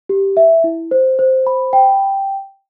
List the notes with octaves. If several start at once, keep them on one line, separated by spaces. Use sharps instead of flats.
G4
E5
E4
C5
C5
B5
G5